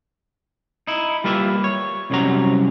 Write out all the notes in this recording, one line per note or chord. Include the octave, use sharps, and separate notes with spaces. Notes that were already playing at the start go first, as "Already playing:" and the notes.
D#4 E4
G3 A#3 F4 B4 E5
C#5
C2 F#2 C3 C#4 F#4 A#5